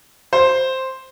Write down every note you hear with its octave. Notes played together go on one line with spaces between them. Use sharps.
C5